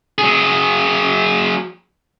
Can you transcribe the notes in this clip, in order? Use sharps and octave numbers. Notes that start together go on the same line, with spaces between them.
F#3 G#4